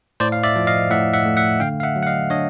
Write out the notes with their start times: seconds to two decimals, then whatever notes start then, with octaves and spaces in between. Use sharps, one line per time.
0.20 A2 C5 D5
0.32 F5
0.44 D5 E5
0.56 F3
0.67 D#5 F5
0.91 A2 E5 F#5
1.13 E5 F#5
1.25 A3
1.37 E5 F#5
1.60 D3 F5 G5
1.80 F5
1.83 E5 F#5
1.96 F#3
2.03 F#5
2.07 D#5 F5
2.30 D4 C#5 D#5